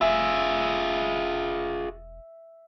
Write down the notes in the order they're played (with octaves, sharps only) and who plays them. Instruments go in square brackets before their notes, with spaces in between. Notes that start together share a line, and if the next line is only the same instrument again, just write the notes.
[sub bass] E1 [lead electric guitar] F4 G#4 [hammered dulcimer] E5